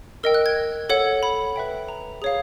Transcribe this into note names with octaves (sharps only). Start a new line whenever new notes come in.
A#4 D#5 G5 E6
F#6
G#6
A4 C#5 F#5
B5
B4 E5 G5
A#5
G#4 C#5 F5